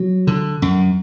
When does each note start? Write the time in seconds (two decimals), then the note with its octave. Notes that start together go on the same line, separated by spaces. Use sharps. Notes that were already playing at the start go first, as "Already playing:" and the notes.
Already playing: F#3
0.27 D3
0.62 F#2